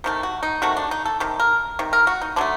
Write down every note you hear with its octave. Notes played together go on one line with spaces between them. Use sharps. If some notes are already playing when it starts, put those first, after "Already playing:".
C3 D#3 A3
F#4
D#4
C3 D#3 A3 F#4
D4
D#4
A4
C3 D#3
A#4
C3 D#3
A#4
F#4
D#4
D3 F#3 A3 D4